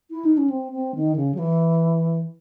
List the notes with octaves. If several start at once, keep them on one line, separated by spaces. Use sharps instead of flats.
E4
D#4
C#4
C4
C4
D#3
C#3
F#3
E3